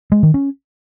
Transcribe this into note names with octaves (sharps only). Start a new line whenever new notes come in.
G#3
D#3
C#4